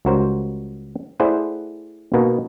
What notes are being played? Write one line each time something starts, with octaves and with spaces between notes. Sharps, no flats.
C#2 G3 F#4 A#4 C5
A3 E4 G#4 C5 D5 F#5
B2 A#3 B3 D#4